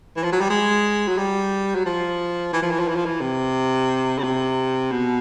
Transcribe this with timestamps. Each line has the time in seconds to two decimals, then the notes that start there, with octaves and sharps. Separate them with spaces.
0.16 E3
0.24 F3
0.32 F#3
0.41 G3
0.50 G#3
1.08 F#3
1.18 G3
1.75 F#3
1.86 F3
2.53 E3
2.62 F3
2.71 E3
2.79 F3
2.88 E3
2.96 F3
3.05 E3
3.21 C3
4.19 C#3
4.24 C3
4.91 B2